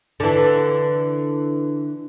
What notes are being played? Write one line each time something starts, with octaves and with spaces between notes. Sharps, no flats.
D3 E3